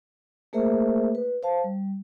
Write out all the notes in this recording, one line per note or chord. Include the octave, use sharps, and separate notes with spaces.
A3 A#3 G#4 A#4 C5 E5
B4
C5 F5 A5
G3